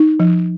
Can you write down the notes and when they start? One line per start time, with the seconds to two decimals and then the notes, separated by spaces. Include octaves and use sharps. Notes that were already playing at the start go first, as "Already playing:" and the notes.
Already playing: D#4
0.20 F3